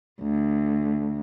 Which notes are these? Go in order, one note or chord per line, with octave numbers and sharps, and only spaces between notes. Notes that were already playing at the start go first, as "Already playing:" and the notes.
D2